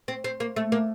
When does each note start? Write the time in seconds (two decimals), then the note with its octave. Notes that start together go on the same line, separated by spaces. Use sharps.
0.08 C4
0.24 C4
0.40 A#3
0.56 A3
0.72 A#3